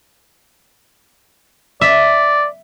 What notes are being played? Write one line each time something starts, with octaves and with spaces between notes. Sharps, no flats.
D5 E5